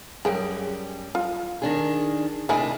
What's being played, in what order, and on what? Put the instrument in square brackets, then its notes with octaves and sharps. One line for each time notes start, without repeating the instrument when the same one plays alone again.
[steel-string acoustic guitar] F#2 G3 [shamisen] G#4 G5
[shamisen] F4
[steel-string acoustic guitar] D#3 D4 G#4
[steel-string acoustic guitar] C3 D4 G#4 [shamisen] D#3 E4 G#5